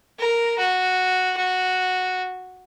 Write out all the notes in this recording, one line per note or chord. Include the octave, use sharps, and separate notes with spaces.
A#4
F#4
F#4